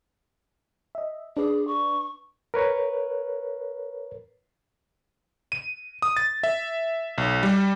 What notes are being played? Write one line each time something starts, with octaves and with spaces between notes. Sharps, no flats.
D#5 E5
D4 G#4 B4 D5
C#6
A#4 B4 C#5
D#7
D#6
A6
E5
B1
G3